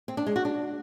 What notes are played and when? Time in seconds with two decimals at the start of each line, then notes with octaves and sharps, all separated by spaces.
0.08 C4
0.17 D4
0.26 G#3
0.36 F#4
0.45 D4